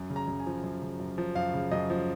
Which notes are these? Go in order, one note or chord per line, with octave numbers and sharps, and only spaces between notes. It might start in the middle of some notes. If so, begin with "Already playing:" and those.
Already playing: F#2
C#3
A#5
F#2
G#5
F3
F#2
C#3
F#2
F3
F#2 F5
C#3
F#2 D#5
F3